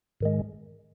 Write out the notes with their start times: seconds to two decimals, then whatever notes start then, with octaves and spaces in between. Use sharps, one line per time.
0.20 G#2 D#3 G#3